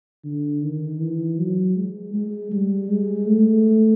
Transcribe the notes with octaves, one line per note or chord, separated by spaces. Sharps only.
D3
D#3
E3
F#3
G#3
G#3
G3
G#3
A3